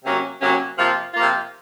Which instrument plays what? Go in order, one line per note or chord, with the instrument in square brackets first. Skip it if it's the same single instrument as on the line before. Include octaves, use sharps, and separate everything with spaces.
[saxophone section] C3 F#3 A#3 C#4
C3 F#3 A#3 C#4
C3 F3 A#3 F4
C3 F3 A#3 F4